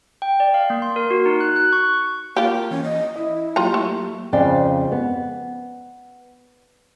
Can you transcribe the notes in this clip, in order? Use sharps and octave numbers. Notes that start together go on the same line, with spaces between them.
G5
D5
F5
A#3
C6
A#4
F#4
D#4
F#6
F#6
C#6
C#6
A#3 F4 G4
E3 C#4
D#5
E4 D#5
F#3 A#3 F4 G4 G5 A#5
A3
F2 C#3 D5 G5
B3